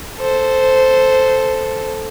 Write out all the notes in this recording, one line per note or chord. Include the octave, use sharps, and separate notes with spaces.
A4 C5